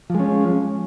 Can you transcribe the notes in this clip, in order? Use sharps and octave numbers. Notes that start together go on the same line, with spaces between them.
F3 G#3 C#4